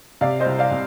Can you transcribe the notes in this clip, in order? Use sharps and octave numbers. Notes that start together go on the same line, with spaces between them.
C3 D5 F5
C5 D#5
C2
D5 F5
C3